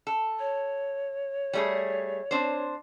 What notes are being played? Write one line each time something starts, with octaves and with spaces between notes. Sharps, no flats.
A4
C#5
G3 A3 G#4
C4 D4 C5